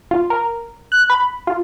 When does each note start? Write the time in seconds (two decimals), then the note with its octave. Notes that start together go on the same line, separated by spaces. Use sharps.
0.11 F4
0.30 A#4
0.92 F#6
1.10 B5
1.47 F4